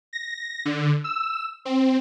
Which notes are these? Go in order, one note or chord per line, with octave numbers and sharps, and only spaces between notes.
A#6
D3
E6
C4